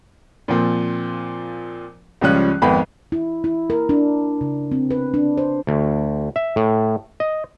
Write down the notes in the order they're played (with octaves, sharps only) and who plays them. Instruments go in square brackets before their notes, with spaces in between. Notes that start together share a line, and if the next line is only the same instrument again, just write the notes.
[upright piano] A#2 F3 C4
C#2 F3 G3 C#4 F#6
G#1 F2 B3 B5
[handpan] E4
E4
A#4
D4
C#3
C4
B4
D4
C5
[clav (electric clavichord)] D2
E5
A2
D#5